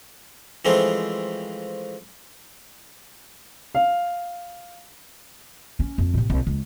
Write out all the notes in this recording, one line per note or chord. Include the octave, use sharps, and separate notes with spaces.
E3 F3 G#3 A3 C4
F5
C#4
F2
A2 C3
C2
C#2